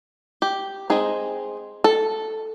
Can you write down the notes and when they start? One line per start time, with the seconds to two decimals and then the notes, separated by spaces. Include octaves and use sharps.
0.42 G4
0.90 G#3 C4 D#4 G#4
1.84 A4